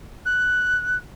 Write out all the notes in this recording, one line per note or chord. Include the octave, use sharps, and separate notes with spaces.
F#6